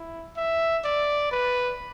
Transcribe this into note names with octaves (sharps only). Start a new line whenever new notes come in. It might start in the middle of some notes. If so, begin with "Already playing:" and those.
Already playing: E4
E5
D5
B4